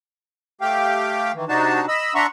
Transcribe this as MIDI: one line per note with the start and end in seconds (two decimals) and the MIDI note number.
0.61 1.32 57
0.61 1.32 67
0.61 1.32 77
0.61 1.32 79
1.35 1.45 51
1.35 1.45 52
1.49 1.86 48
1.49 1.86 62
1.49 1.86 63
1.49 1.86 66
1.49 1.86 81
1.88 2.14 75
1.88 2.14 83
1.88 2.14 88
2.15 2.26 62
2.15 2.26 76
2.15 2.26 78
2.15 2.26 82
2.15 2.26 84
2.15 2.26 85